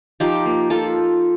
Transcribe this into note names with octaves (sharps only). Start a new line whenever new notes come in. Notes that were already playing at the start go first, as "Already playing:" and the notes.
F3 D#4 G4
A#3
F3 F4 A4